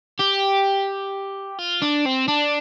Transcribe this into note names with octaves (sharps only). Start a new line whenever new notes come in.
G4
F4
D4
C4
D4